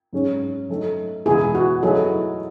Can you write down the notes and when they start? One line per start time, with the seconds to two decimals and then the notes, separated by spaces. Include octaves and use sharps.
0.13 G#2 F#3 C#4 G#4 C#5
0.69 F#3 A3 D#4 A4
1.25 E2 B2 G#3 B3 E4 G#4
1.55 F#4
1.83 F#3 A3 D#4 E4 G#4 A4 C#5